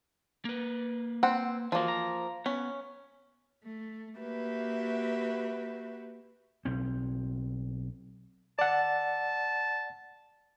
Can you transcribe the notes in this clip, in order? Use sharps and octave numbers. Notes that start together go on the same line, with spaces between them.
A#3 B4
C4 F#5
E3 F3 A#3 F#4
A#5
B3 C#4
A3
A#3 F#4 G4 B4 E5
B1 C4
D5 F#5 A5